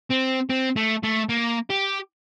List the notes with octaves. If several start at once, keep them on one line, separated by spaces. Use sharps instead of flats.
C4
C4
A3
A3
A#3
G4